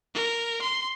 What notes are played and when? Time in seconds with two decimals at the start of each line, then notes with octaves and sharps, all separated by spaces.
0.14 A#4
0.62 C6